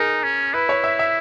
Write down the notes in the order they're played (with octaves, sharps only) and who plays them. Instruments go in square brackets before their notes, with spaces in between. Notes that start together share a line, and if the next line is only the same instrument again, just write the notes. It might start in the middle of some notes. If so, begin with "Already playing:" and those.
Already playing: [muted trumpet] D#4 [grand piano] G#4 A#4
[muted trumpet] C#4
[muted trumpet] E4 [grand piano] B4
[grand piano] C#5
E5
E5